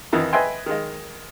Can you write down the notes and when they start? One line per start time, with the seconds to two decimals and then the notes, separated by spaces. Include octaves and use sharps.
0.12 F2 D#3 E3 D#4
0.33 B4 D#5 E5 G5 G#5 C6
0.66 D#3 G#3 D#5